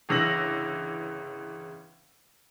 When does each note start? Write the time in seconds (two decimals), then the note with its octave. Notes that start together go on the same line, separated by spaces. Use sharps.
0.09 G1 C#3 E3 E6 A#6 F#7